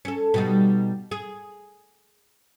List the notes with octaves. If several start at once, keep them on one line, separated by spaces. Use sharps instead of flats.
C#4 A4
B2 G3 D#4
G#4